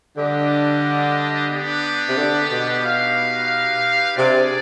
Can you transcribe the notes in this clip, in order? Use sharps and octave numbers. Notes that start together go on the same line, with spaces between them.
D3 G3 D4 G4 B4 D#5
B3 D4 G4 B4
C3
D3
B2
D#4 G4 B4 F5
C3 D4 G#4 D5